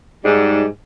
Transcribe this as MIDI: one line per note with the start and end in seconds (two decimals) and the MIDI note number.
0.24 0.65 44
0.24 0.65 55